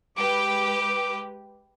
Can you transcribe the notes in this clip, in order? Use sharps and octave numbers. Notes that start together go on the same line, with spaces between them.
G#3 G4 B4 D6